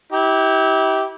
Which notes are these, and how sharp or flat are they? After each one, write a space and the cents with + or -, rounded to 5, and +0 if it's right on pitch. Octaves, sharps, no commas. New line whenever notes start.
E4 -35 G4 -15